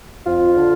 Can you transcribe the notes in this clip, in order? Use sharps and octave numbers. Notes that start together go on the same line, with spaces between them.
F2 F4
D3